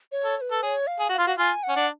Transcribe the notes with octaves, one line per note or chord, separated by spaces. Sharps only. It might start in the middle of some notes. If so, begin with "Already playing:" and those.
C#5
A4
C#5
B4
A4
G#4 C#5
F5
G#4
F#4 F5
F4
F#4
F4 G#5
F#5
C#4
D4